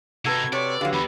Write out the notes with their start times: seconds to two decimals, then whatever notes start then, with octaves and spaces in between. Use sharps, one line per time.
0.25 C3 D#4 F#4 A4 B4 G#6
0.52 C3 C#5 D5
0.81 D3 F#3 G4 F5
0.93 E2 B5